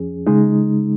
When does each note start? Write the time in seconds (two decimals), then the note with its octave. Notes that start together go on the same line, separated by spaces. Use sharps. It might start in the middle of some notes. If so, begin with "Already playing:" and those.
Already playing: F2 F3 C#4 G#4
0.27 C#3 G#3 D#4